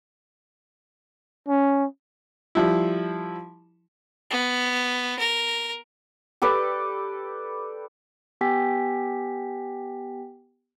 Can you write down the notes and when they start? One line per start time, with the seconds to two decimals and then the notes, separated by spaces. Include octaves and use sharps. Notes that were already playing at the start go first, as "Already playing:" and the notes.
1.48 C#4
2.55 F3 G3 E4
4.30 B3
5.19 A#4
6.42 G4 A4 B4 D5
8.41 B3 G4 G5 G#5 B6